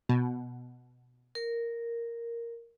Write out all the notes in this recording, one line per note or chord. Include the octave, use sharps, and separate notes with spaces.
B2
A#4